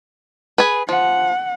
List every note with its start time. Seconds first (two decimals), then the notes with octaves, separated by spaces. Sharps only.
0.58 G#4 B4
0.89 F3 F#5